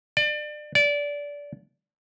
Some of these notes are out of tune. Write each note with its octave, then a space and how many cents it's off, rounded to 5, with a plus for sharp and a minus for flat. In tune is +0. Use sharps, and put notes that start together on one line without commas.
D5 +30
D5 -20